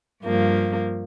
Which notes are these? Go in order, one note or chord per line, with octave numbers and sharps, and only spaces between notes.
G2 F3 A#3